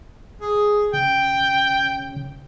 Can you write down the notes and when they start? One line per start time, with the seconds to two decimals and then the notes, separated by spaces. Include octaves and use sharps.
0.42 G#4
0.94 C#3 G5